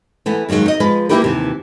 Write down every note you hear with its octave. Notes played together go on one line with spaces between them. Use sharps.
E3 A3 B3
G2 D#3 F3 F#3 G#3
D#4 D#5
F3 G#3 B4
A#3 C#4 E4 G4 A#4 B4
D#2 C3 E3